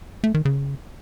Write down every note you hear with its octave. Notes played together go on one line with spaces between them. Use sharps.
A3
D#3
C#3